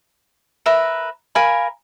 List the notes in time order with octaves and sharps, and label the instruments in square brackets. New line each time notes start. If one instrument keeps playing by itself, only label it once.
[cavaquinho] A#4 B4 E5 A#5
A#4 F5 G#5 B5